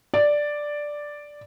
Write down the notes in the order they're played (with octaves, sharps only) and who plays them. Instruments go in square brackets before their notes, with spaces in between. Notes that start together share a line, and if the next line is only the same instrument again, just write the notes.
[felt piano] D5